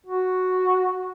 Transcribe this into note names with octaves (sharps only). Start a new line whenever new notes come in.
F#4